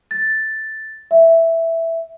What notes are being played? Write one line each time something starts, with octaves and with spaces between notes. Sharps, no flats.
A6
E5